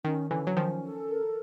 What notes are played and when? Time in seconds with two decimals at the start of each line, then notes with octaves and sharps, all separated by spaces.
0.04 D#3 C#4
0.30 D3 E3 C#4
0.47 F#3
0.57 D#3 F3 C#4
0.83 A4
1.09 A#4